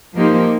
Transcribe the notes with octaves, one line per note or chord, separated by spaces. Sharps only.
F3 A#3 D#4 G4 C5